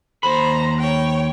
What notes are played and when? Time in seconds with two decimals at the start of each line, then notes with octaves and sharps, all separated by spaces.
0.23 D#2 C5 A#5 B5
0.79 C#5 G5